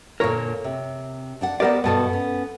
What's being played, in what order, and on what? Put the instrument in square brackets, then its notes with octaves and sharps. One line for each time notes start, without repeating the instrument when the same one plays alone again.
[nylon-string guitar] A#2 D3 [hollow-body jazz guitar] A#4 C#5
[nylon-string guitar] C3
D4 D5 F#5
[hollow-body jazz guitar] B3 A#4 D5 [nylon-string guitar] G4 C5 F#5
[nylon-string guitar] G2 B2 A4 [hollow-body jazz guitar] B3 A5
[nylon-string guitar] C#4